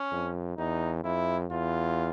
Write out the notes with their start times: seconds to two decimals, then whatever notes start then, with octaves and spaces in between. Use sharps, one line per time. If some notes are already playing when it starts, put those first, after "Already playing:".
Already playing: C#4
0.12 F2
0.58 E2 D#4
1.04 F2 E4
1.51 E2 F4